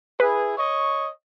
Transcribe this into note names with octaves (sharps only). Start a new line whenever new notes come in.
E4 G#4 B4
C#5 D#5 C#6